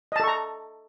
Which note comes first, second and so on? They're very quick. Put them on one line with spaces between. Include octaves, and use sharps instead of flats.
D#5 A5 A4 C#6 A#5